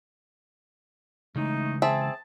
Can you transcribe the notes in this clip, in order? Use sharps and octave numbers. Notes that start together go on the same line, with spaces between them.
C#3 E3 G#3 A3 D#4
C4 G#4 E5 A5